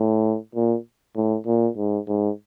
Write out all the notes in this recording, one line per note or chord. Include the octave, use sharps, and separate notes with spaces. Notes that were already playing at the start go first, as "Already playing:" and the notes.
Already playing: A2
A#2
A2
A#2
G#2
G#2